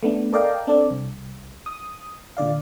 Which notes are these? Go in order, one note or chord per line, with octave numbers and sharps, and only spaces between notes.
A3 B3 D4
A4 A#4 D5 D#5 F5 G5
C4 D4 A4 D5
C2
D#6
A#2 D3 D5 F5